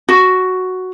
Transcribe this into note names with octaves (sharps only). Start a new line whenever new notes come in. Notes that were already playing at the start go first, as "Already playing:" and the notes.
F#4